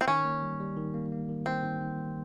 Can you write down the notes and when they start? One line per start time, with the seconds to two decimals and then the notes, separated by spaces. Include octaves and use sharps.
0.01 C4
0.08 D#3 C#4
0.25 A#3
0.43 G3
0.60 G3
0.77 D#3
0.94 A#3
1.12 A#3
1.29 D#3
1.46 D#3 C4
1.63 D#3
1.81 D#3
1.98 G3